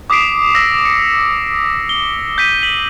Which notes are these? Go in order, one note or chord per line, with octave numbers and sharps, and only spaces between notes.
D6 D#6 B6 C7 D7
E6 A#6 B6
C#7
G7
G6 B6 D#7
B6 D#7 F#7